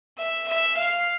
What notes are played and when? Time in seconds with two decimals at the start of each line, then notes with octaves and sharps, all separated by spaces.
0.18 E5
0.48 E5
0.77 F5